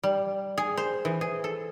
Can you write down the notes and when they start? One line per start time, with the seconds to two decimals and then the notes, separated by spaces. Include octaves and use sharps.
0.03 G3
0.58 G#4
0.77 C5
1.05 E3
1.21 G#4
1.44 A4